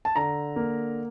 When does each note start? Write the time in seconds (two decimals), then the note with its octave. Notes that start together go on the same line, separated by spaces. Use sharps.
0.05 A5
0.16 D3 A#5
0.56 A#3